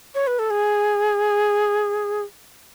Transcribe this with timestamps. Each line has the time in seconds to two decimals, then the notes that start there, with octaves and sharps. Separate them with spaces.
0.15 C#5
0.27 B4
0.39 A4
0.50 G#4